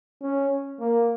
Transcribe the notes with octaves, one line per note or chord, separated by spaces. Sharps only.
C#4
A#3